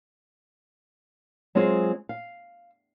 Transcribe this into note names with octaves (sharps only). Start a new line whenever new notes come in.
F#3 G#3 C4 F4 G#4
F5